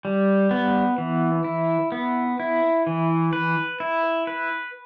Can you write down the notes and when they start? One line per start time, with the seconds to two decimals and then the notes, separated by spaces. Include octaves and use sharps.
0.05 G3
0.51 B3
0.98 E3
1.44 E4
1.92 B3
2.40 E4
2.87 E3
3.33 B4
3.80 E4
4.27 B4